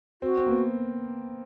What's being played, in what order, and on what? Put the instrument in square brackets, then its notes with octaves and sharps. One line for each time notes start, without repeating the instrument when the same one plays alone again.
[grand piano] C4 [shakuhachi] F#4
[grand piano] C4
A#3
B3